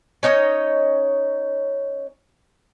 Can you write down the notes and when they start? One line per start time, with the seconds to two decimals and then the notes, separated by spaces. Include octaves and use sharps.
0.23 C#4 D#4 C#5 D#5